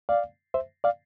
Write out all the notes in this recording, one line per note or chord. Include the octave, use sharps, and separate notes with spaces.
D5 F5
C5 E5
D5 F5